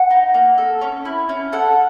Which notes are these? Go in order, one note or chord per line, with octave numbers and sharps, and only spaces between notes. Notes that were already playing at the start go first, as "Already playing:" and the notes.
Already playing: F#5
D#4
A#3
A4
C#4
E4
C#4
A4 F#5